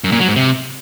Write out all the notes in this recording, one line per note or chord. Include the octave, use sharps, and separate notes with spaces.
F#2
A#2
F#3
G#2
C3